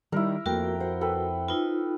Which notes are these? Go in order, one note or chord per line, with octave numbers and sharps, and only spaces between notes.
D#3 G3 E4 A#4
F2 A3 A#3 F#4 A#4 G5
C5 F#5
A4 B4 G5
D#4 F4 B4